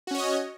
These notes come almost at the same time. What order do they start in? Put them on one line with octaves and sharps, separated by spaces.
F#4 C#4 C#5 D#5